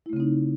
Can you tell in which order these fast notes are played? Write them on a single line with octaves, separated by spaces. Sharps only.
E4 A3 C#3 C4 D#4